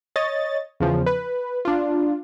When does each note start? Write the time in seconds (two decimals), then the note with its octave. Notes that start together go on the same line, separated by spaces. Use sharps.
0.16 C#5 D#5 A6
0.80 E2 C#3 F3
1.06 B4
1.65 D4 F4